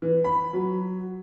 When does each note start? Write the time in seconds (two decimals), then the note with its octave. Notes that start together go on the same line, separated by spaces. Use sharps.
0.02 E3
0.24 B5
0.53 F#3